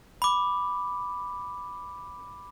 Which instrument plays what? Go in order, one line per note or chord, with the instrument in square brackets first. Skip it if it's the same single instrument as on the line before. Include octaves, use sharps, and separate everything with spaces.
[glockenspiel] B5 D6